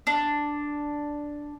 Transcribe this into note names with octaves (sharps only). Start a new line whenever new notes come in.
D4